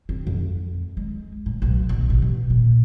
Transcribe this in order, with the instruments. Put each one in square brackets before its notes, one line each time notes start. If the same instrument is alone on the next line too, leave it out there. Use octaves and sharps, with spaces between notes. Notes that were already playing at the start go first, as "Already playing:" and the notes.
[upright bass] C4
F2
G#3
A2
B1
B2
A1
B2
A#2